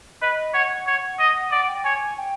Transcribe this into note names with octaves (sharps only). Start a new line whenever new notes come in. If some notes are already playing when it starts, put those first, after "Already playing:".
B4 D#5
C#5 F#5
C#5
D#5
D5 F#5
G5
C#5 G#5
G5